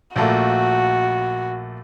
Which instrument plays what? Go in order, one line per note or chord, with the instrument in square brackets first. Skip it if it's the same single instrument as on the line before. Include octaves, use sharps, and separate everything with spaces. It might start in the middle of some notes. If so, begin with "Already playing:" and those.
[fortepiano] A#1 A3 A#3 [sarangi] F#4